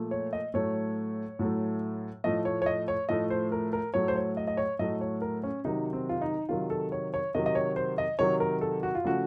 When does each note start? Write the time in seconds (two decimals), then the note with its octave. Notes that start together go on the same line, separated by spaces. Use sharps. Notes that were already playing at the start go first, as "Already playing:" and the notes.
Already playing: A#2 F3 A3
0.11 C#5
0.33 D#5
0.54 A2 F#3 A3 C#5
1.39 A2 F#3 A3
2.24 A2 F3 A3 D#5
2.45 C#5
2.62 C#5
2.66 D#5
2.88 C#5
3.09 A2 F3 A3 D#5
3.30 C5
3.52 A#4
3.73 A#4
3.94 A2 F#3 A3 C#5
4.08 C5
4.16 C#5
4.37 D#5
4.47 D#5
4.57 C#5
4.79 A2 F#3 A3 D#5
5.01 C#5
5.22 A#4
5.43 C#4
5.64 C3 D#3 F#3 D#4
5.93 C4
6.09 F4
6.22 D#4
6.49 C3 D#3 F#3 F4
6.70 A4
6.92 C#5
7.14 C#5
7.35 C3 D#3 F#3 D#5
7.46 D#5
7.55 C#5
7.76 C5
7.98 D#5
8.19 C3 D#3 F#3 C#5
8.40 A#4
8.61 A4
8.83 F#4
8.95 F4
9.04 C#3 F3 A3 F#4